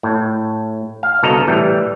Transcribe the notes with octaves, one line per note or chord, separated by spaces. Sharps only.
A2
F5
C2 B2 D3 A4 D#5 A#5
A2 E3 G3 A3